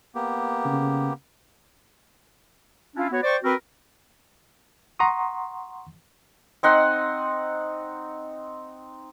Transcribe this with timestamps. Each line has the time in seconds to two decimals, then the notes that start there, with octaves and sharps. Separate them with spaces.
0.15 A#3 B3 G4
0.65 C#3
2.95 C#4 D4 E4 F4
3.11 B3 F#4 B4 C#5
3.23 C5 D5 G5 C#6
3.43 C4 F#4 A#4 B4
4.99 F#5 A#5 C6 C#6 D#6
6.63 C4 D#4 F#5 C6